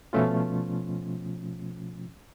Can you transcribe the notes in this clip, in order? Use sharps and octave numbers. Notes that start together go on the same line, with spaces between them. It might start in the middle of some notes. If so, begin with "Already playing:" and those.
B2 F3 A3 C#4 F4